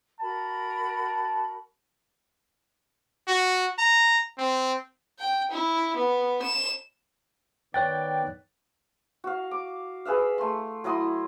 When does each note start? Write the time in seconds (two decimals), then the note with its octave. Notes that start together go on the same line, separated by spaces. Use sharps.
0.20 F#4 A#4 A5 B5
3.28 F#4
3.79 A#5
4.38 C4
5.19 G5
5.51 E4
5.96 B3
6.42 E7
7.74 D#3 B3 C#5 D5 G5 F#6 A6
9.24 F#4 F5
9.51 D6
10.05 G#4 B4 E5 F5
10.38 A3 C6
10.84 F#3 E4 C6 D#6